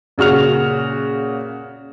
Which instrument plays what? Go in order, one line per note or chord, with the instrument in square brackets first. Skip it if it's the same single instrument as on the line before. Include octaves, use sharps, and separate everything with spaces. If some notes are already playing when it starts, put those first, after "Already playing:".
[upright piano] A#2 C#3 F#4 F6 F7